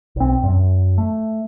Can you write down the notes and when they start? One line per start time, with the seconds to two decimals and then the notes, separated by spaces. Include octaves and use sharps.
0.16 B1 C4
0.43 F#2
0.98 A3